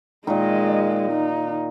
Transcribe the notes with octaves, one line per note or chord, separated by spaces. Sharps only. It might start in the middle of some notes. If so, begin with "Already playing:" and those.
A#2 D#3 G#3 D#5
D#4